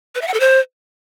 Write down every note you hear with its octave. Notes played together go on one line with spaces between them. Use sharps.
B4
E5
F#5
A4
C5